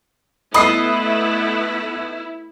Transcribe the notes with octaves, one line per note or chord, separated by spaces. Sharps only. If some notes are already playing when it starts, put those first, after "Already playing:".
A3 B3 E4 D#5 B5 D#6 C7